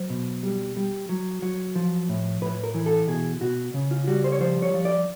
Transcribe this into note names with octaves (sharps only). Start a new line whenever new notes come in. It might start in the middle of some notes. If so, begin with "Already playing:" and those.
Already playing: F#3 C5
B2
G3
G3
F#3
F#3
F3
A2
A2 B4
A#4
E3
A4
B2 G#4
B2 F#4
C#3
F4
G3 F#4
C5
C#5
F3 C5
C#5
F3
D5